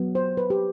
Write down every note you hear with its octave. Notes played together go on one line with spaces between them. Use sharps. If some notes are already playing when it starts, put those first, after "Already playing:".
Already playing: F#3 B3
C5
B4
G4